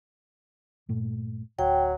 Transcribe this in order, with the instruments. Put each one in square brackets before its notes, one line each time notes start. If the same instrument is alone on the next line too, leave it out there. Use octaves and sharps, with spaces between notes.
[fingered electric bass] G2 A#2 A3
[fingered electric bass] D1 [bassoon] F#3 [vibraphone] G5